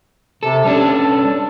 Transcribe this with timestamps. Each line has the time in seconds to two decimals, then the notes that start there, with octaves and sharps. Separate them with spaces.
0.43 C3 A4
0.65 G3 C#4 D4 A4